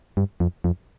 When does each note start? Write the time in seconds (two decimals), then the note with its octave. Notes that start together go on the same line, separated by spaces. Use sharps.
0.17 G2
0.40 F2
0.64 F2